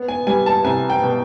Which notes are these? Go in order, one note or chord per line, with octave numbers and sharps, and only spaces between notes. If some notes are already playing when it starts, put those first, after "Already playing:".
Already playing: B3
G#5
G3 G#5
A5
C2 G#5
G5
B2